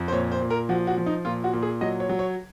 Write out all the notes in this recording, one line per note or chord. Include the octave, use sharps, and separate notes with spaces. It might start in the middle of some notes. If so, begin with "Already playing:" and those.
Already playing: F2
C5
A#2 C#5
C5
A#2
A#4
F3 F#4
F#4
F3
D#4
A#2 F4
F#4
A#2
G#4
F#3 D#5
C#5
F#3
C#5